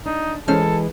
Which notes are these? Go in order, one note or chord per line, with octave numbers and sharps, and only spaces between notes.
D4 D#4
E3 G#3 C#4 A4 C5 F6